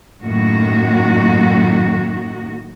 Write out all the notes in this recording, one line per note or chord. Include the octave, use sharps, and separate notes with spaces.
F#2 A2 D#3 A#3 F#4